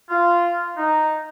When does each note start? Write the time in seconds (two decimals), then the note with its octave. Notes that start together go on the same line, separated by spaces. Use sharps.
0.10 F4
0.78 D#4